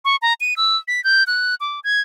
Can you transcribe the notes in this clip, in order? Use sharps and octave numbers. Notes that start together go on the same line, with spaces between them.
C#6
A#5
D#7
E6
B6
G6
F#6
D6
G#6